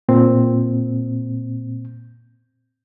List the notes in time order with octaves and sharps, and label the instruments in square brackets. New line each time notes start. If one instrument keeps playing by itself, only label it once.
[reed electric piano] A#2 C4